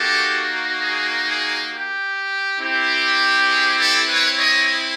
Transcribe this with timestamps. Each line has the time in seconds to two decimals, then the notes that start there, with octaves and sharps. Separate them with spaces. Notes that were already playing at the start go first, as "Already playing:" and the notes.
Already playing: A#3 D#4 F#4 G4 A4
0.80 G#4
1.25 G#4
1.70 G4
2.58 C4 E4 G4
3.48 G#4
3.77 G4 A4
4.07 B4 C#5
4.36 C#5 D#5